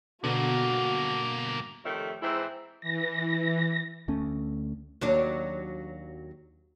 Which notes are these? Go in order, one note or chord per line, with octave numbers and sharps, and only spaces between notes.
G2 B2 D3 A#3 F#4 D#7
F2 C3 D#3 A3 C#5 E5
G#2 E3 G#3 C4 E4
E3 A#6
D2 A3 C#4
D#2 F#3 D4